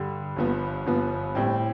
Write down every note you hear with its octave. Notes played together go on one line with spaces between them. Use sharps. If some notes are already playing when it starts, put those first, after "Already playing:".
Already playing: G2 D3 G3
G1 G2 F3 B3
G1 G2 F3 B3
A2 G3 C4